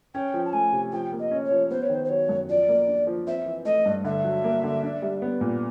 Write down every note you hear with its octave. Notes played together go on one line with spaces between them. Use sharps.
C#4 G5
F3
A5
A3 G#5
C3
F3 G5
A#3
D#5
C#4
C#5
F3
B3 C5
C#5
D#3 C5
C5
F#3 C#5
F#2
F3 D5
A#3
D4
F3
C4 E5
E3
A3 D#5
G2
D3 E5
F#3
A#3
D3
D4
G3
B3
A#2